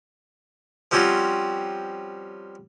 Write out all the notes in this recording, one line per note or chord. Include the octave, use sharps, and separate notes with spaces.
F3 G3 C4 C#4 F4 F#4